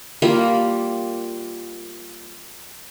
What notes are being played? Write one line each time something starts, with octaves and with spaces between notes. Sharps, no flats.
G3 A#3 F4